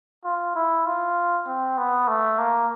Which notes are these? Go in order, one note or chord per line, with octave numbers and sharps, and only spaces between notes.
F4
E4
F4
C4
B3
A3
A#3